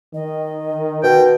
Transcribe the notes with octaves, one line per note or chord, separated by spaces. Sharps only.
D#3 D#5
B2 G5